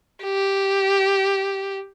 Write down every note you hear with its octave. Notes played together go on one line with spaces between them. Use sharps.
G4